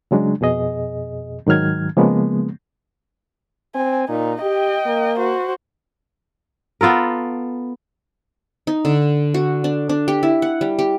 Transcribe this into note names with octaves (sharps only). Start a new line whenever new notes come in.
C#3 F#3 G#3 D4
F2 B2 G#4 D#5
G#2 D#3 F#3 F6 G#6
C#3 F3 G#3 A#3 B3
C4 G#5
A#2 D#4
G4 D#5 G5
A#3
F#4 C5
B3 F4 A4 A#4
D#4
D3
F#4
D4
D4
G4
E4
F#5
G3
G4